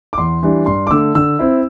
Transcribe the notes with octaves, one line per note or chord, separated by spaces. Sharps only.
D6
E2 C6
E3 G3 D4
G2 C6
D6
D3 A3 E6
D3 E6
C4 E4